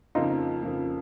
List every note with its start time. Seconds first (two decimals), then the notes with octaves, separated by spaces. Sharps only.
0.15 F2 C#3 F3 A#3 D#4 F4
0.62 F2 C#3 F3 A#3